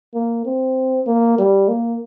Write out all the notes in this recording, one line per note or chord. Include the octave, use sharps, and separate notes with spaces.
A#3
C4
A#3
G3
A#3